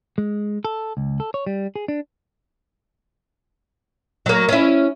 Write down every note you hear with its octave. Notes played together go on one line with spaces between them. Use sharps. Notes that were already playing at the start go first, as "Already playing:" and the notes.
G#3
A4
C#2
A4
C#5
G3
G#4
D4
F#3 A#3
C#4 E4